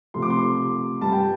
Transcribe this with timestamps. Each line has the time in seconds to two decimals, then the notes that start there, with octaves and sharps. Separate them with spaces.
0.14 C3 F3 A3 C6
0.22 D6
0.30 C6
1.01 G2 G3 A5
1.12 G5